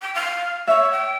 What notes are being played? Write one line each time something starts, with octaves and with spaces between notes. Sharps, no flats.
G5
F5
C#5 E5
G5